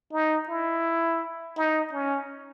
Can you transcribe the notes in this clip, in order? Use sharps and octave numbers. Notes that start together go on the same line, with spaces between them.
D#4
E4
D#4
C#4